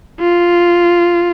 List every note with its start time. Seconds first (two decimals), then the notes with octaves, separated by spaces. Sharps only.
0.20 F4